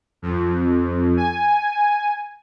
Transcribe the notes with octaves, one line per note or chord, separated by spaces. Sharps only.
F2
G#5